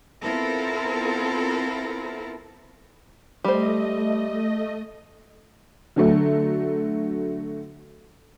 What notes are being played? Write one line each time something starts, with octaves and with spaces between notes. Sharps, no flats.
B3 C4 E4 F4 A4 A#4
G3 A3 C5 D#5
D3 F#3 A3